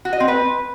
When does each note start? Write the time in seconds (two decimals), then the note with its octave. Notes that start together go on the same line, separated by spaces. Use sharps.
0.05 F#4
0.13 D#5
0.20 C4
0.28 B4